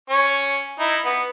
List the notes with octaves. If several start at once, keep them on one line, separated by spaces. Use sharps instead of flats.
C#4 C#5
D#4 E4
B3